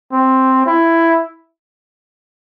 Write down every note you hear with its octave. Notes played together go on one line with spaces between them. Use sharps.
C4
E4